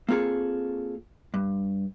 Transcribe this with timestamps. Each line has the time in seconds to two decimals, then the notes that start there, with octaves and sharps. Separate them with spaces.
0.09 A#3 C4 F4 G#4 A4
1.34 G2